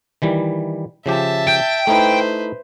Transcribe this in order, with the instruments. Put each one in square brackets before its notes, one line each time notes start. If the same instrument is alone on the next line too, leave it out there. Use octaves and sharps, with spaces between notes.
[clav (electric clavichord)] D#3 E3 G3
[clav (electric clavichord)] C#3 F3 G4 [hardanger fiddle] E5 A5
[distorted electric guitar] G5
[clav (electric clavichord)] A3 D#4 E4 [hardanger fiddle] B4 C5